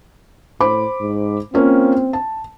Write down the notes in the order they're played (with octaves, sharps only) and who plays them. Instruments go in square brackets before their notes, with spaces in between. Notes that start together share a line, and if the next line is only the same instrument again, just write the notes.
[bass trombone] A2 [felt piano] C5 B5 D6
[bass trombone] G#2
[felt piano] A#3 C#4 F4 [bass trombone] C4
[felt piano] A5